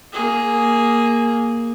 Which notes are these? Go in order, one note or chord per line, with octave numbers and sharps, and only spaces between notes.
A#3 G#4